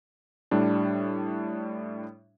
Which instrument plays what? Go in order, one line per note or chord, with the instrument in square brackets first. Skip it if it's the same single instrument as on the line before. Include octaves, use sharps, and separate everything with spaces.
[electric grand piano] A2 G3 D4